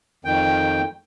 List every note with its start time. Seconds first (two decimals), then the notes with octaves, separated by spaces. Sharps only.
0.25 F2 D#3 G5